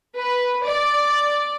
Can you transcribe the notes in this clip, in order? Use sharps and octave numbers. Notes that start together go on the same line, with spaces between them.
B4
D5